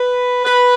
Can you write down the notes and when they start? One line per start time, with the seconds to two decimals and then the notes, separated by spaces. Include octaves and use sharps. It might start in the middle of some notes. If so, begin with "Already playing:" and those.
Already playing: B4
0.45 B4